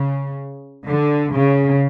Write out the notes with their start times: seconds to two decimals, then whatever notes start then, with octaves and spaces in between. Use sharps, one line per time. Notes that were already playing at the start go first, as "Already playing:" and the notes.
Already playing: C#3
0.87 D3
1.33 C#3